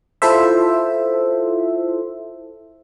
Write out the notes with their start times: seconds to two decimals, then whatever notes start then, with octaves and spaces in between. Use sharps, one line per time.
0.22 E4 F4 A4 C5 E5